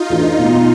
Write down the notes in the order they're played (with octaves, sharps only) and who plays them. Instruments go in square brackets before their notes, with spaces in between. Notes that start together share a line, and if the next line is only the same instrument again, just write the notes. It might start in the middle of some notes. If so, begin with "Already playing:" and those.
Already playing: [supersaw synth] D#4 F4
[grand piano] E3 A3 D4 F#4
B2